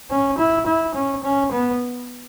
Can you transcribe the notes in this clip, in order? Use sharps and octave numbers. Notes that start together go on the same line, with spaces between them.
C#4
E4
E4
C#4
C#4
B3